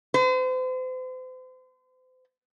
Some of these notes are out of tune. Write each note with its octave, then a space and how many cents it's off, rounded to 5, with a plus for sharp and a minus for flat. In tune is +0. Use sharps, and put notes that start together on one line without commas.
C5 -40